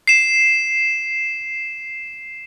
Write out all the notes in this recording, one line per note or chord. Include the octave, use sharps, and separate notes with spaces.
C7 E7